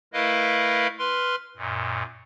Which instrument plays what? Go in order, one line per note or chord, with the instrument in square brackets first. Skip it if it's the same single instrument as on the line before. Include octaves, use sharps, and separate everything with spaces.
[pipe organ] A3 E4 A#4 B4 D#5 F5
B4 C6 F6
F#2 A#2